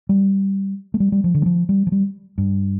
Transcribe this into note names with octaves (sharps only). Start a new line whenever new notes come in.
G3
A3
G3
G3
F3
D3
G3
F3
G3
F3
G3
G2